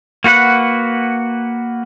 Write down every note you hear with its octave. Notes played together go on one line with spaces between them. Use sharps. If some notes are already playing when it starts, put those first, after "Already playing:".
A#3 F#4 B4 F#5